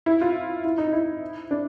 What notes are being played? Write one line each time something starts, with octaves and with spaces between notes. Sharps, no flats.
E4
F4
E4
D#4
E4
D4